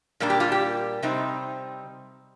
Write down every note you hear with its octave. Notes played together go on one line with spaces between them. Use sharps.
A#2 G3 A#3 D4
G4
F4
G4
C3 G3 C4 D#4